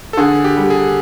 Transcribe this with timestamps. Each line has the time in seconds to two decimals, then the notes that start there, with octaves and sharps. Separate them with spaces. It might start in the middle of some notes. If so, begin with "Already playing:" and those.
0.13 A4
0.17 D3 G#4
0.44 G4
0.57 G3
0.70 G#4